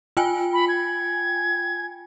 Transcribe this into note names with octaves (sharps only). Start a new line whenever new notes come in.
F4 G5 G#5
B5
G#6